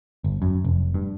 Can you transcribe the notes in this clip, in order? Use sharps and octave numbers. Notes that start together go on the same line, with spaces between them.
G1
F#2
F1
G2